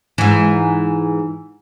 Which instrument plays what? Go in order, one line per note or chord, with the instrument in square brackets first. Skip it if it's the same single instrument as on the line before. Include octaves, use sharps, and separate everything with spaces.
[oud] G#2 E3